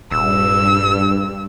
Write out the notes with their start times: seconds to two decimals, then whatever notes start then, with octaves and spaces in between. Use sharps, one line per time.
0.11 D#1 G2 E6